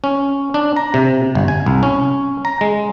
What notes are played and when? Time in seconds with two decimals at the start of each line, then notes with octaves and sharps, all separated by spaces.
0.04 C#4
0.54 D4
0.76 A#5
0.94 C3
1.35 G1
1.48 G#5
1.66 C2
1.83 C#4
2.45 A#5
2.61 G#3